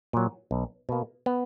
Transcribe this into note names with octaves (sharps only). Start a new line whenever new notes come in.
A#2 F#3
B1
B2 A#3
B3